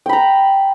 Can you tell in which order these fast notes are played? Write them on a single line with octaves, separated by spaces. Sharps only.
G5 B5 A#5